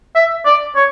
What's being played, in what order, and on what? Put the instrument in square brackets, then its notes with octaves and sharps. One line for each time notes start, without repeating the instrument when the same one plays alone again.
[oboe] E5
D5
C#5